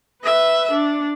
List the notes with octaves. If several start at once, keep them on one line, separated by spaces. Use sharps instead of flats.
B4 E5
D4